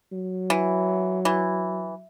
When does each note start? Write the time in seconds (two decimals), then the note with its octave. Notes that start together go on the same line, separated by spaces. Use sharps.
0.12 F#3
0.50 E3
1.25 E3